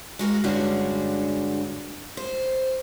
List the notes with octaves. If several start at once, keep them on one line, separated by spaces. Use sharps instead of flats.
G#3 F#4 A#4 F5
G2 D3 G#3 C#4 D4 F#4
C5